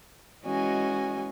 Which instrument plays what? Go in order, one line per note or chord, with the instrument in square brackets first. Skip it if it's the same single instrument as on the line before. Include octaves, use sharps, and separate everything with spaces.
[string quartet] E3 G#3 C#4 F#4 D#5 G#5